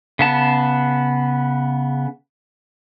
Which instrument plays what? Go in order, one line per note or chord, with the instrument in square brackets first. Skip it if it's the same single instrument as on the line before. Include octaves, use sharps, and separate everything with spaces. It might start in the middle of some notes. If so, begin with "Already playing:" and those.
[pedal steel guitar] C#3 B3 A5